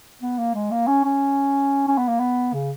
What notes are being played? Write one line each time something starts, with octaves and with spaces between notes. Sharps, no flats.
B3
A#3
G#3
A#3
C#4
C#4
C#4
B3
A#3
B3
C#3